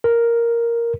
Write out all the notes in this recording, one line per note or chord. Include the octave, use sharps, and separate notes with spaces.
A#4